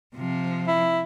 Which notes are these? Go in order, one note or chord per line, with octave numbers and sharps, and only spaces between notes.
C3 F3
E4